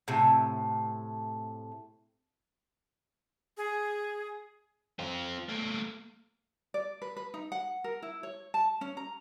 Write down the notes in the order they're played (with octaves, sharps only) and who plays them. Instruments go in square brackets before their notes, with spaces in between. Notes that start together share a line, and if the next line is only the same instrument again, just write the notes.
[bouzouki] A2 C3
[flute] G#4
[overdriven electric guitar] C4 F4
A3 A#3
[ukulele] D5
B4
B4
D#4
F#5
A#4
E4
C#5
A5
C#4
A#5